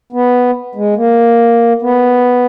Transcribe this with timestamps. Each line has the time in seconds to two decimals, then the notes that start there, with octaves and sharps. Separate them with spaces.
0.13 B3
0.75 G#3
0.97 A#3
1.82 B3